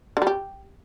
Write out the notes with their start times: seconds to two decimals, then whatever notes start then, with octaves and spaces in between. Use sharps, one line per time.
0.17 D3
0.22 G3
0.27 G4